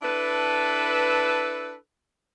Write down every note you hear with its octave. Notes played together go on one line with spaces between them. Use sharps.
D4 E4 A4 B4